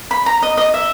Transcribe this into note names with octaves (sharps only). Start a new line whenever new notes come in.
B5
A#5
D#5
D#5
E5